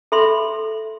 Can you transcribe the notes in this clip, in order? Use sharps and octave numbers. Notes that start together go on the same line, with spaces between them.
A4 E5 B5 C6